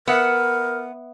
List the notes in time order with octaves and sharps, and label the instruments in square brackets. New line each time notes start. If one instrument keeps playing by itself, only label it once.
[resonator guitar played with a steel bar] B3 [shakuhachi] A#4 [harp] E5 F#5